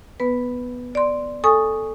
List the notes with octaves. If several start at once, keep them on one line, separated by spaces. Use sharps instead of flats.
B3 B4
D5 C6
A4 G#5 C#6 D#6